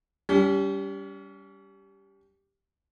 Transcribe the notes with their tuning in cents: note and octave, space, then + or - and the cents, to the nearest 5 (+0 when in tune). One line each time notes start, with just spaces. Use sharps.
G3 +0 C#4 +40